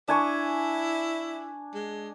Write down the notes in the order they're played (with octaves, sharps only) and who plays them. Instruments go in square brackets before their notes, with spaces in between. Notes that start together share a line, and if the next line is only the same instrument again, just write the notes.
[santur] D4 G#5 C#6 [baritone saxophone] E4
[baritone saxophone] G#3